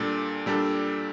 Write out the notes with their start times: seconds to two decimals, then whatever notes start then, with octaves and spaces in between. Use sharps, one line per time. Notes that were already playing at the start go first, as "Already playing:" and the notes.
Already playing: A#2 G3 D4 A4
0.46 A#2 G3 D4 A4